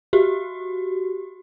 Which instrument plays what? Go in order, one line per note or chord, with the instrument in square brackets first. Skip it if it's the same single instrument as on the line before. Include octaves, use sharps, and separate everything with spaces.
[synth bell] F#4 G4